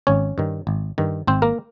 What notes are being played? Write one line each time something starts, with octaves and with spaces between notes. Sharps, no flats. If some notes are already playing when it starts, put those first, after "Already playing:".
G#1 C#4 C#5
G2 D#3
G#1
G2 D#3
G#1 C4 C5
A#3 A#4